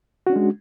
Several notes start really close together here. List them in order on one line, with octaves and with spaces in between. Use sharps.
F#4 C#4 D4 G#3